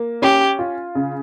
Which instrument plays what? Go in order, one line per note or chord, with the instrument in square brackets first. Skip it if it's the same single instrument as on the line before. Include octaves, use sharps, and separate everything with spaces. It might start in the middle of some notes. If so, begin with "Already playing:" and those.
Already playing: [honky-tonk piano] A#3
[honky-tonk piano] C#4 [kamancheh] G4
[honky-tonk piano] F4
C#3